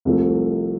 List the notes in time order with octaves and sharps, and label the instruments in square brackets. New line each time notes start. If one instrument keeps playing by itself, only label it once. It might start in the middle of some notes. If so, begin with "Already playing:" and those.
[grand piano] C2 C3 F3 A3